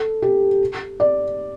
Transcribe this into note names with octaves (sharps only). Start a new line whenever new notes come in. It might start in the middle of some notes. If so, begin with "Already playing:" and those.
Already playing: A4
G4
D5